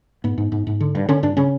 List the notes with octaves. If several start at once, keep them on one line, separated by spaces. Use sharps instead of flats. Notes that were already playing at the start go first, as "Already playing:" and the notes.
G#2 B3
G#2
G#2
G#2
D3
G2
D3 C#4
G2 D4
C#3 C#4